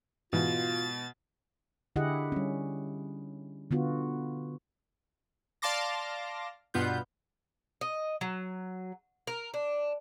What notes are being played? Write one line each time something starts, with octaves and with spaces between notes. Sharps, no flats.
G#2 B2 E3 F4 A6
D3 E4 G4 G#4 D#5 F#5
G3 C#4
D3 B3 F4 F#4
D5 F5 A5 C6 D6 A#6
G2 B2 B3 F4 G6
D#5
F#3
A#4
D4